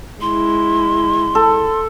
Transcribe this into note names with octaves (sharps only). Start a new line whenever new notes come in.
G#3 E4 C6
A4